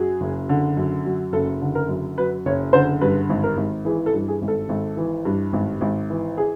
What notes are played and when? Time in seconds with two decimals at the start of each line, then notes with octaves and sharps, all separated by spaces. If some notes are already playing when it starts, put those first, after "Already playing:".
Already playing: F#2 F#3 G#4
0.21 F#1
0.49 D3
0.77 F#2
1.05 F#3
1.33 F#1 A4
1.61 D3
1.75 A#4
1.89 F#2
2.18 F#3 B4
2.46 F#1 C#5
2.73 D3 C5
3.01 G2 B4
3.29 G#1
3.43 A#4
3.57 G#1
3.85 E3 G#4
4.06 A4
4.14 G2
4.28 G#4
4.42 G#1
4.48 A4
4.69 G#1
4.97 E3
5.25 G2
5.53 G#1
5.81 G#1
6.10 E3
6.38 G#4